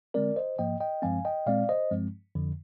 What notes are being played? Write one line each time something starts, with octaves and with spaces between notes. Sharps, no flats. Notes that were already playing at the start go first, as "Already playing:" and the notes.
D3 G#3 C4 A#4 D5
C5 D#5
G#2 F3 A#3 D#5 G5
D#5 G5
G2 F3 G#3 C4 F5 G#5
D#5 G5
A#2 G#3 C4 D5 F5
C5 D#5
G2 F3 G#3 C4
F2 D3 F3